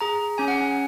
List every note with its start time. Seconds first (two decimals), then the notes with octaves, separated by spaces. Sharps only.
0.01 G#4 A#5
0.38 C#4 G#5
0.48 F#5
0.57 G#5